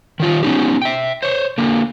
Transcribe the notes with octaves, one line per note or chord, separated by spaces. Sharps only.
D#3 G3 F4
B3 C#4 D#4 G4
E5 G5
C5 C#5
D3 A#3